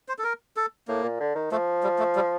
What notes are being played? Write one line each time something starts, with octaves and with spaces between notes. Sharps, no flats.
C5
A4
A#4
A4
A2 A#3
A#2
D3
D#3
F3 A3
G3
A3
G3